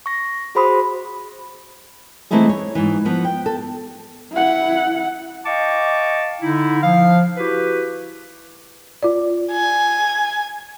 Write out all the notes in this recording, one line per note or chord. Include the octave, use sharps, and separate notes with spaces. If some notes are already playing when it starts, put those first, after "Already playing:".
C#6 A#6
F#4 G#4 C5 B5 C6 D#6
E3 A3 C4 D#4 E4 G#4
C#5
G#2 E3
F3 B3
G5
A4
E4 F#5
D#5 F5 G5 A5 C#6 D6
D3 D#4 E4
F3 F5
E4 F#4 G4 B4
F4 D5
G#5